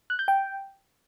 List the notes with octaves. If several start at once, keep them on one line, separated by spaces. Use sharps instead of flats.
F#6
G6
G5